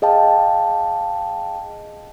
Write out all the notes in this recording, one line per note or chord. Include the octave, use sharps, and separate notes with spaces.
G#4 D#5 F5 G5 A5